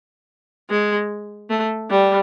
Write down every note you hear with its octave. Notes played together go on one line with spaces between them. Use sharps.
G#3
A3
G3